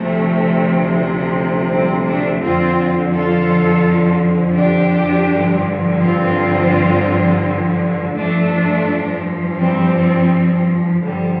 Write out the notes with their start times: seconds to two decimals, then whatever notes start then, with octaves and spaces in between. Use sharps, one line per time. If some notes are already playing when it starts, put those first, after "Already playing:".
Already playing: D2 C3 F3 A3
1.69 G3 C4
2.05 A3 D4
2.41 F2 D3 F3 C4 F4
3.13 F4 A4
4.56 D4 G4
5.28 G2 D3 F3
6.00 C4 F4
8.15 G2 F3 A3 D4
9.59 G3 C4
11.02 G2 D3 F3 G3